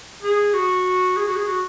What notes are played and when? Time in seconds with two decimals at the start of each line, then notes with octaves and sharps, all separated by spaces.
0.22 G#4
0.54 F#4
1.17 G#4
1.27 F#4
1.37 G#4
1.48 F#4